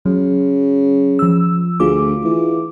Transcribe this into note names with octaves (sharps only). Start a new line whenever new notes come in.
C#3 F#3
F3 E6
D2 F4 G#4 D6
E3